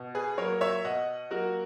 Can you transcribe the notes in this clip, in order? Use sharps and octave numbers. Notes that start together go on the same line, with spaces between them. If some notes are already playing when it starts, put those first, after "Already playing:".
Already playing: B2
G#4 B4
F#3 A#3 A#4 C#5
C#5 E5
B2 D#5 F#5
F#3 A#3 F#4 A#4